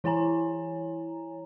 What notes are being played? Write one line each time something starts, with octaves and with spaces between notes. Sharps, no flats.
E3 E4 C#5 G#5 A#5